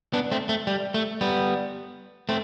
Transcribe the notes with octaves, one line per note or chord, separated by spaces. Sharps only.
B3 D4
A3 C4
A3
G3
A3
G3 B3
A3 C4